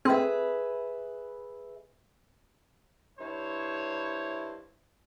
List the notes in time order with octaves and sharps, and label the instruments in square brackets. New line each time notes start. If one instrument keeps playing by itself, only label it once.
[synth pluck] C4 [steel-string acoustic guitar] G#4 B4 E5
[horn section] G2 E4 C5 C#5